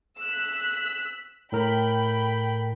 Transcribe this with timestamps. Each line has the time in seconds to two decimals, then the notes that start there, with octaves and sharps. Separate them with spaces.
0.20 E6 F#6 B6
1.52 A2 A#4 G5 B5